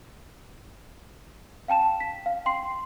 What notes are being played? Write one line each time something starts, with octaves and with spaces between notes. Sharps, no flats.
F5 G5 A5 E7
B6
F5
G5 C6 C7